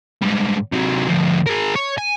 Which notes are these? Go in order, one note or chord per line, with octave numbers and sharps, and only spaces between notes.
G#2 G3
C3 F#3
D2 F3
G#4 A#4
C#5
G#5